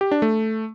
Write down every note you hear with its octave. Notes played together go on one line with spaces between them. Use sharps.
G4
D4
A3